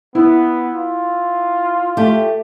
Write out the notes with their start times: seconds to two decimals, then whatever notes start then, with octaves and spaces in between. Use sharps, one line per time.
0.15 B3 E4
0.75 F4
1.97 A3 G4